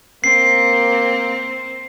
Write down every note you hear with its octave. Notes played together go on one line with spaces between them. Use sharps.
A#3 C4 C7